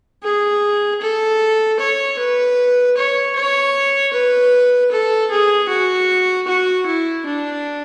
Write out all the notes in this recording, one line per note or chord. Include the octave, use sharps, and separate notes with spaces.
G#4
A4
C#5
B4
C#5
C#5
B4
A4
G#4
F#4
F#4
E4
D4